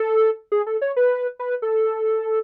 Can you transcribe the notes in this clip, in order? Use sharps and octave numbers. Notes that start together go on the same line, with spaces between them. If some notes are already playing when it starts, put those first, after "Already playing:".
Already playing: A4
G#4
A4
C#5
B4
B4
A4